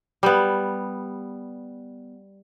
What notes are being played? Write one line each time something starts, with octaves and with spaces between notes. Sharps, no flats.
G3 B3